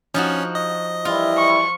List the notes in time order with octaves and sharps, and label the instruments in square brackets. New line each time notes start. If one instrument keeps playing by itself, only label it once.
[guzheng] F3 D#4 F#4 [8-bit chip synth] C#4
[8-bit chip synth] D#5
[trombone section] E3 G3 E4 [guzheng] F4
[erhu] C#6